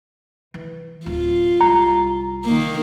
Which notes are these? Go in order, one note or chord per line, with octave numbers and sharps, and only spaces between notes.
E3
D1 F4
C2 A#5
D#3 A#3